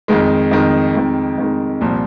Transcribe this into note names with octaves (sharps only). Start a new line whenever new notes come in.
F2 D#3 G#3
F2 D#3 G#3
F2 D#3 G#3
F2 D#3 G#3
C2 A#2 F3